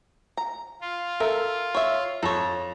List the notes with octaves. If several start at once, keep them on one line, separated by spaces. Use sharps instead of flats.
A#5
F4
A4 A#4 E5
C#5 E5
F2 A4 C#5